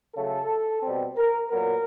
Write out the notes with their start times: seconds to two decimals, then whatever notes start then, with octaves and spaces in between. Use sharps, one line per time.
0.15 C#3 F#3 A3 A4
0.83 B2 G3 C4
1.16 A#4
1.50 A#2 F#3 B3 A#4